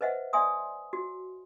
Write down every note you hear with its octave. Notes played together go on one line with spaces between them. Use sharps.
B4 C5 D#5 E5 F#5
D5 E5 G#5 C6 D#6
F#4